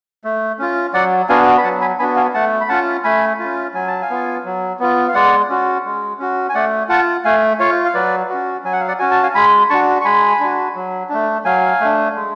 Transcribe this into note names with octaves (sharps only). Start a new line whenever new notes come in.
A3
C#4 F4
F#3 D5 F#5
B3 D4 F#4 F5 G#5
B5
F#3 F#5 A5
G#5 B5
B3 D4 F#4 G#5 B5
F5 G#5
A3 F#5 A5
B5
C#4 F4 F#5 A5
A3 G#5 B5
C#4 F4
F#3 G#5
A5
F5 G#5
B3 F4
F#3
B3 F4
F5
G#3 D5 F#5
C#4 F#4
G#3
C#4 F#4
G#5
A3 D5 F#5
F4 F#5 A5
A3 F5 G#5
F4 C#5 F5
F5
F#3 B4 D5
C#4 F#4
F#3 G#5
F#5
F5
D5 F#5
C#4 F#4 G#5
A5
F5 G#5
G#3 G#5 B5
D4 F#4 A5 C#6
C#6
G#3 G#5 B5
D4 F#4
F#3
A3 D4
F#3 F5 G#5
A3 D4
G#3